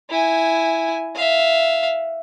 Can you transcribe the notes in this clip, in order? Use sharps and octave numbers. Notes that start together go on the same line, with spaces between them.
E4 G#5
E5 F5